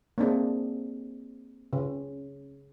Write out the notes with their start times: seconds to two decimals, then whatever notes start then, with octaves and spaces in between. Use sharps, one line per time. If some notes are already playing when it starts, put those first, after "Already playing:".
0.18 A#3 C4 D4 G#4
1.73 C#3